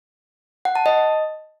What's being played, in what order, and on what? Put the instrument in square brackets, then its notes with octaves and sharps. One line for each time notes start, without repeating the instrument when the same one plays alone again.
[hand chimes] F#5
A5
D#5